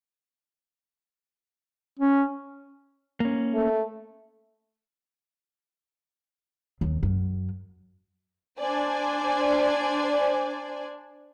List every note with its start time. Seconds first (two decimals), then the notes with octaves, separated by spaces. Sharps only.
1.99 C#4
3.20 A#3 C#4
3.54 A3
6.81 D#2
7.03 F#2
8.61 D4 C5 D5 G#5